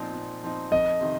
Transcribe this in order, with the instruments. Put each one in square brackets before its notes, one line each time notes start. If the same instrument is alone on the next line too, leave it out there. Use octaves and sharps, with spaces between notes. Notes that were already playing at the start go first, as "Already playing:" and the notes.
Already playing: [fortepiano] A#2 F3 C4 D#4
A#2
F3 C4 D#4
[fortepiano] F2 [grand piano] D#5
[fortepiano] C3 D#3